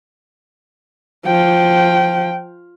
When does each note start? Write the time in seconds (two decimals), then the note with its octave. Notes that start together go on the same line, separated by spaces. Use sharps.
1.27 F3 G5